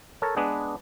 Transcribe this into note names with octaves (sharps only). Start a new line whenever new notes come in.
A4 A#4 C#5
G#3 B3 D4 G#4 B4